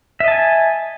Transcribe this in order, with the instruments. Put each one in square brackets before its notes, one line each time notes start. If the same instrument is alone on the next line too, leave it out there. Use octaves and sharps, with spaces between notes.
[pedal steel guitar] E5
D#5
A5
G#5